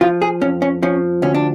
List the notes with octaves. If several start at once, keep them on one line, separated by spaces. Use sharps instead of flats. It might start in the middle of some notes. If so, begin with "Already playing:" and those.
F3 F4
G#4
F2 C#4
C#4
F3 C#4
D2 C#4
D4